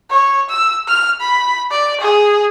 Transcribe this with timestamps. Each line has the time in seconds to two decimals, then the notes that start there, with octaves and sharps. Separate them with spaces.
0.10 C#5
0.50 E6
0.88 F6
1.21 B5
1.71 D5
2.00 G#4